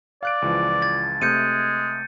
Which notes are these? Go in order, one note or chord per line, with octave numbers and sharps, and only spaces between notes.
D5 F5 F#6 D7
C#2 E3 F3
G#6 A6
C3 G#3 A3 G6 C#7 D#7